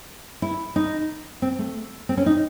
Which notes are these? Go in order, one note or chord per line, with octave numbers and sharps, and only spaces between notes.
E4
D#4
C4
A3
C4
C#4
D#4